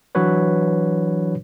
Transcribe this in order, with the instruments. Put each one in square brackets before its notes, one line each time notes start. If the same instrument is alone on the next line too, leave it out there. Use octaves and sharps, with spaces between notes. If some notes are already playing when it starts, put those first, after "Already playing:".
[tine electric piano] E3 F#3 D4 F#4 B4 C#5